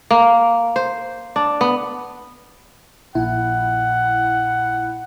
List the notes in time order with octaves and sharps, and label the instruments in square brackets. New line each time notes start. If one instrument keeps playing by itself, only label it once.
[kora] A#3
C5
D4
B3
[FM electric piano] A#1 A#2 E4 [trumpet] F#5